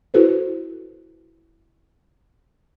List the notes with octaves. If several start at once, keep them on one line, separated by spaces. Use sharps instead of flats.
E4 F#4 A4 B4 C5